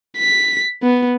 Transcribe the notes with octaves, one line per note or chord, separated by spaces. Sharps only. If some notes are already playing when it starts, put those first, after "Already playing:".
B6
B3